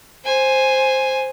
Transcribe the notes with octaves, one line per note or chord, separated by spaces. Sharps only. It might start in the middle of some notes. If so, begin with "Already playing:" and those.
C5 G#5